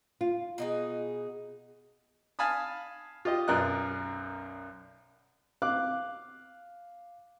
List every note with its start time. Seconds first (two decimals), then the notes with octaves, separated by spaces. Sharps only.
0.21 F4
0.58 B2 D#4 G#4
2.39 F5 G#5 A5 B5 D#6
3.25 F4 G4 D#5
3.48 B1 F#2 A#4 D5 D#5 F#6
5.62 F5 D6 F#6